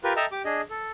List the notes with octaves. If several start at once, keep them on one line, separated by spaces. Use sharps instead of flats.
F4 G4 A#4 B4
A4 D#5 E5 G5 A5 A#5
G4 D6
D4 G#4 D#5
A4